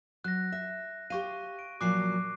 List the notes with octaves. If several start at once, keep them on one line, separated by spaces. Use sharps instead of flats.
F#3 F#6 A#6
E5
G4 C5 F5 C#6 D#7
D7
A#2 F3 F#3 D6 F#6 C7